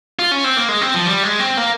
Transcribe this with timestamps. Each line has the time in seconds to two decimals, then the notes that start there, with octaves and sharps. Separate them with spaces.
0.19 F4
0.31 C#4
0.44 C4
0.57 A#3
0.69 G#3
0.81 C4
0.94 F3
1.06 G3
1.23 G#3
1.39 C4
1.57 A#3